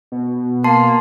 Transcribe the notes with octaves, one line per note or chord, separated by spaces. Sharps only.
B2
A#3 A5 C6 C7